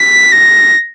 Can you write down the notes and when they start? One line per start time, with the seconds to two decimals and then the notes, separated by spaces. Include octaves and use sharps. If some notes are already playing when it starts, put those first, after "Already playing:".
Already playing: B6
0.32 A#6